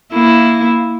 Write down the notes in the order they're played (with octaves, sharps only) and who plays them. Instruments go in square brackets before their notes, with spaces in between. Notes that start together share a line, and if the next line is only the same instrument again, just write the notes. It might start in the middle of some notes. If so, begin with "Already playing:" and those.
[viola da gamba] A#3 E4